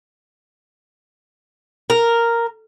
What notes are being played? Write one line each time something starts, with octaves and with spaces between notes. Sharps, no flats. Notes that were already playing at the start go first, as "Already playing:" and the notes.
A#4